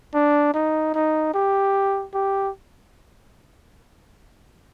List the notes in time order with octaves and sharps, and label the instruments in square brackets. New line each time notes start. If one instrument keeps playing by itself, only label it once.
[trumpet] D4
D#4
D#4
G4
G4